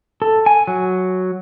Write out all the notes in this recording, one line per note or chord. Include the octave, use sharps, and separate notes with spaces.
A4
G#5
F#3